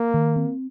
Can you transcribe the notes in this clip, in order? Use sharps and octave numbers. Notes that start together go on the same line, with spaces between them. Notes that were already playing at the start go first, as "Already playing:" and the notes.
Already playing: A#3
D#3
C4